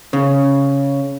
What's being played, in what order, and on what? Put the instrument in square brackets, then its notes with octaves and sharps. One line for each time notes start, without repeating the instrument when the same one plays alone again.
[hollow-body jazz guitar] C#3